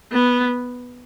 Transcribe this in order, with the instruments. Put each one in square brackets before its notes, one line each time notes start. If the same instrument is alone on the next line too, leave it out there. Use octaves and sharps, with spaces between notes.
[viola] B3